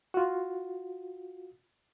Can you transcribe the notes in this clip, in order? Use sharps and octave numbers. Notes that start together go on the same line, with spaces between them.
F4 F#4